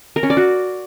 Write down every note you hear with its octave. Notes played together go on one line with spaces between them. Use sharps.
A#4
C#4
D5
F#4